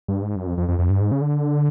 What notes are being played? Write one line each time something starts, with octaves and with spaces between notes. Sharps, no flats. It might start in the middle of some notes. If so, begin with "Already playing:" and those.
G2
G#2
F#2
F2
F2
F2
F2
G2
G#2
C#3
D3